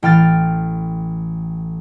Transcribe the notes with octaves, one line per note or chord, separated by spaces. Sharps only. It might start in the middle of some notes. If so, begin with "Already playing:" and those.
A1 G5 F6 A6